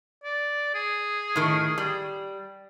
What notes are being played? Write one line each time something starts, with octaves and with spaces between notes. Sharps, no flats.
D5
G#4
A2 D#3
G3